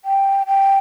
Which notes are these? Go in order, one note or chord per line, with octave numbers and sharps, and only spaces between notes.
G5
G5